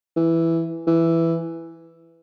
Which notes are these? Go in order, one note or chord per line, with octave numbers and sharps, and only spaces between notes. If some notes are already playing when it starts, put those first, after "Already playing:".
E3
E3